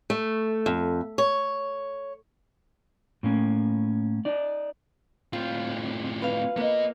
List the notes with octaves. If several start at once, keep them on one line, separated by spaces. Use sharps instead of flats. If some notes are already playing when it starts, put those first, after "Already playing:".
A3
F2
C#5
A2 A#3 C#4
D#4 D5
A2 C4 F4
B4 F5
A#3 B3 D#5